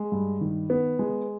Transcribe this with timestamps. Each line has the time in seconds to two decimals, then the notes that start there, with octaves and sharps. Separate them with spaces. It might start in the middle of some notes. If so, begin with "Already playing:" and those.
Already playing: G#3
0.12 G2
0.41 D#3
0.70 B3
0.99 G#3